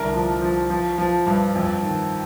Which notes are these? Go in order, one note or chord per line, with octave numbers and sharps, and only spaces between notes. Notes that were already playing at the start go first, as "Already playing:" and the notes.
Already playing: C2 D3 A#4
F3
F3
F3
F3
G2
F2
D#3